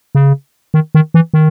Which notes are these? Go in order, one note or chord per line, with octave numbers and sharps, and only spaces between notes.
C#3
D#3
D#3
E3
D#3